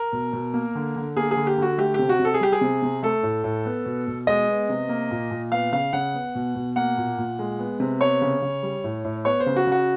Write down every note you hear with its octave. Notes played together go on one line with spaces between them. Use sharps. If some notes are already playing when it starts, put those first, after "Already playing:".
Already playing: A#4
B2
B2
A#3
D3
D3
A#3 G#4
G#4
D3
G4
D3 F#4
A3 G4
C3 G4
F#4
C3
A4
G#4
G3 G4
G#4
C3
C3
A3 A4
A2
A2
B3
B2
B2
G#3 D#5
B3
C3
A#3
A#2
A#2
B3 F5
C#3 F5
C#3 F#5
B3
B2
B2
A#3 F#5
A#2
A#2
G#3
B3
C3
B3 C#5
C#3
C#3
G3
A2
A2
B3 C#5
C5
C#3
F#4
C#3 F#4